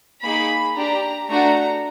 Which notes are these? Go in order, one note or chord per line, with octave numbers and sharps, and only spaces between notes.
A#3 D#4 G#4 B5
D4 G4 A#5
A3 D4 F#4 A#5